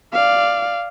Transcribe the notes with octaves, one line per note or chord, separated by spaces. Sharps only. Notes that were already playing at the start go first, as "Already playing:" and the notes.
D5 F5